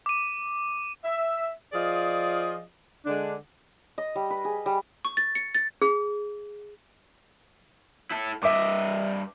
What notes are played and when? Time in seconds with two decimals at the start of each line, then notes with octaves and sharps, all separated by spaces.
0.06 D6 D#7
1.03 E5
1.73 F3 F4 G#4 D5 D#5
3.05 D3 G#3 D4
3.98 D#5
4.16 G3
4.30 B4
4.45 G#4
4.66 G3
5.05 C#6
5.17 A6
5.35 C#7
5.55 A6
5.82 G#4
8.11 E4 A4
8.43 G2 D#5 E5 D6